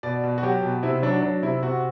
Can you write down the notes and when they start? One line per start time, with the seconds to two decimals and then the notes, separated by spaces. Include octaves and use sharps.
0.03 B2 D5
0.24 B2
0.38 F#4
0.43 F#3 G4
0.63 B2
0.83 C3 E4
1.03 F#3 D4
1.22 F#3 D4
1.42 C3 E4
1.62 C3 F#4